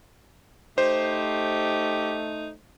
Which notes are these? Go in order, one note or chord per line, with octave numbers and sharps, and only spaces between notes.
A3 D#4 G4 C5